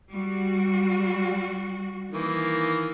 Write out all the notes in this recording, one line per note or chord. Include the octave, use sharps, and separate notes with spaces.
G3 F#4
D#3 E3 A#3